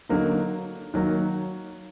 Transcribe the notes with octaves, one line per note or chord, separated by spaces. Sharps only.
D3 F#3 A#3 D#4
D#3 F#3 A#3